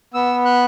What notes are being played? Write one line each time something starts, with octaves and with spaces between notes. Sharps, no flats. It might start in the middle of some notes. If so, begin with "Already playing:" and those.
B3 E6
F#6